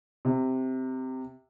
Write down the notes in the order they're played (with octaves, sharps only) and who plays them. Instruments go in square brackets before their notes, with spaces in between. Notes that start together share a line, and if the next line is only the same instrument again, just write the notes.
[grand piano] C3